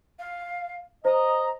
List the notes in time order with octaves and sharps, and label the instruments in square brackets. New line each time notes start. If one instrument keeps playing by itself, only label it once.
[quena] F5
[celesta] C5 [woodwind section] D#5 [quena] A#5